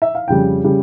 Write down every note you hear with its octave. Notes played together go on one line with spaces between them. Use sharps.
E5
F5
F2 C#3 G3 G5
C#3 G3